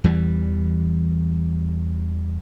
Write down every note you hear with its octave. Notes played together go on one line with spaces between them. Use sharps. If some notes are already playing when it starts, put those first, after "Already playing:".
E2 E3 G3